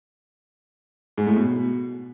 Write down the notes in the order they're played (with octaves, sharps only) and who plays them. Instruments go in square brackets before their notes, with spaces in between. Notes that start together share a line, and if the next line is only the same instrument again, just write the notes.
[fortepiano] G#2
A2
B2